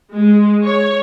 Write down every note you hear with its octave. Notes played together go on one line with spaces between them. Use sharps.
G#3
C#5